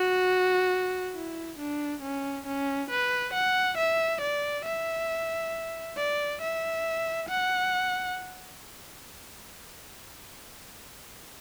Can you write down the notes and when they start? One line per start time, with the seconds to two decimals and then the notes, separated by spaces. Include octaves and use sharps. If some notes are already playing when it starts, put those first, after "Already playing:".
Already playing: F#4
1.14 E4
1.59 D4
2.02 C#4
2.46 C#4
2.90 B4
3.34 F#5
3.78 E5
4.21 D5
4.65 E5
5.97 D5
6.41 E5
7.29 F#5